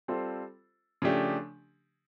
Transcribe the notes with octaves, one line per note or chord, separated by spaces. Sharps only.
G3 C4 F4 A4 C5
C#3 F3 A3 D4 G4